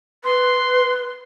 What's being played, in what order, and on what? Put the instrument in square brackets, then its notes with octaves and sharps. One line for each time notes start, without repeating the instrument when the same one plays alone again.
[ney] B4 [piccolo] C6